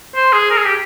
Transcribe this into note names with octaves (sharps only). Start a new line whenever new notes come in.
C5
G#4
A#4
G#4
G4